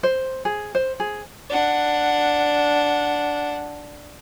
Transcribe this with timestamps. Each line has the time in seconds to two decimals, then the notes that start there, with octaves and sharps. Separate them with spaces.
0.03 C5
0.45 G#4
0.75 C5
1.00 G#4
1.50 D4 F#5